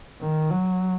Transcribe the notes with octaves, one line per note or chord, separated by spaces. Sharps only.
D#3
F#3